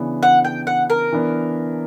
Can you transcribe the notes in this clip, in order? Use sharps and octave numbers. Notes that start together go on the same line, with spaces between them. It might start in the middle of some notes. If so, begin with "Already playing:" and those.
Already playing: C#3 E3 B3 D4
F#5
G5
F#5
A#4
E3 B3 D4